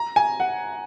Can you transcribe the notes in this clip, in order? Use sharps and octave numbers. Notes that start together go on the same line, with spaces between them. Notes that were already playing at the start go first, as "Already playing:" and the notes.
Already playing: A#5
G#5
F#5